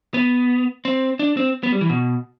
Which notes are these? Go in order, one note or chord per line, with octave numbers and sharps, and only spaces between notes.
B3
C4
D4
C4
B3
G3
E3
B2